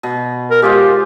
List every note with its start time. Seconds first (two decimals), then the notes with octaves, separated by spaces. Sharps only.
0.03 B2
0.50 A#4
0.62 G#3 F4 G4 C5